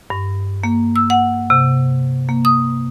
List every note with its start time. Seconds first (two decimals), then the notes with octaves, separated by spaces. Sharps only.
0.10 G2
0.64 A#3
0.96 E6
1.10 F#5
1.50 C3
2.29 A#3
2.45 D#6